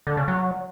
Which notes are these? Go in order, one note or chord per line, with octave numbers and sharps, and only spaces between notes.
D3
C#3
F#3